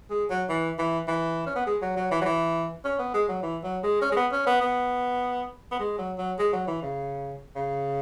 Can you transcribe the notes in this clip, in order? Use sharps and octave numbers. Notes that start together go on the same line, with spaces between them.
G#3
F#3
E3
E3
E3
C#4
B3
G#3
F#3
F#3
E3
F#3
E3
C#4
B3
G#3
F#3
E3
F#3
G#3
C#4
G#3
B3
C#4
B3
B3
B3
G#3
F#3
F#3
G#3
F#3
E3
C#3
C#3